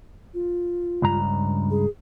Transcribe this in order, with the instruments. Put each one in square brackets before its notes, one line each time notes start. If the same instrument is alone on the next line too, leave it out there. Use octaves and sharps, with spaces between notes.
[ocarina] F4
[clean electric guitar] C#2 G2 A#5
[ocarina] G#4